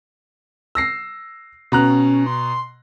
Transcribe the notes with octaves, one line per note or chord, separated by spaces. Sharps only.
E6 A#6 C7
B2 C#4 A#5 F#6
C6